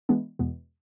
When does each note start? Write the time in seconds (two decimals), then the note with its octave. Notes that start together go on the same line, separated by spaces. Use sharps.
0.09 E3 G#3 B3 D4
0.39 E2 B2 G#3 B3